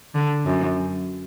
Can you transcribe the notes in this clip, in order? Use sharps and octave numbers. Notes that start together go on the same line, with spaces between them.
D3
F#2